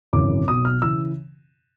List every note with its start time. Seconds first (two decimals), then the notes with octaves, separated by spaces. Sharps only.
0.13 G#1 F#2 C#3 E3 D6
0.48 B1 B2 D#6
0.65 F6
0.82 C#3 E3 E6